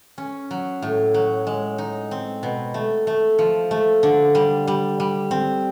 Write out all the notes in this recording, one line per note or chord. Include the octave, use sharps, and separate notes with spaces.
C#4
F#3
A2
F#3
G#3
D#4
C4
B2
A3
A3
F3
A3
D3
G3
G3
G3
C4